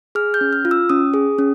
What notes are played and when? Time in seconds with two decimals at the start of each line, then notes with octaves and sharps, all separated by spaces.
0.15 G#4 F6
0.34 G6
0.41 C#4
0.53 F6
0.65 F4
0.71 E6
0.90 C#4 D#6
1.14 G#4
1.38 C#4